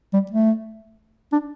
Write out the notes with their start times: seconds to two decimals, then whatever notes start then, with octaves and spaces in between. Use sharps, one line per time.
0.14 G3
0.31 A3
1.32 D4